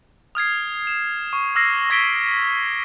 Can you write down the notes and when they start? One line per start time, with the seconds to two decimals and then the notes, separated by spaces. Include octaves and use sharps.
0.35 D#6 F6 G#6 C7
0.87 E7
1.33 C#6
1.55 D6 E6 F6 A#6 C7
1.90 C#6 G#6 A#6 B6 D7 G7